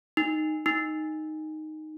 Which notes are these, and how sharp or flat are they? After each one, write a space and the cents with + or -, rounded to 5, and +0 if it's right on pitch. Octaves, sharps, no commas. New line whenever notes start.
D#4 -10
D#4 -5